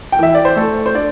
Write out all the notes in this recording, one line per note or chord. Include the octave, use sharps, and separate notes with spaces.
G5
E3 E5
D5
C5
A3 A4
C5
D4 D5